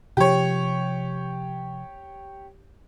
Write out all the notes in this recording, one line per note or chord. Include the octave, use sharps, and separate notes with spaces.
C3 F3 G4 C#5